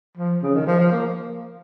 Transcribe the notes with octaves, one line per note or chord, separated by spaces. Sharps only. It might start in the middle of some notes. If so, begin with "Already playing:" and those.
F3
C#3
D#3
F3
F3
A#3